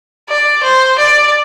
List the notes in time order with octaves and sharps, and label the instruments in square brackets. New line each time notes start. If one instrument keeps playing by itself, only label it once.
[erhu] D5
C5
D5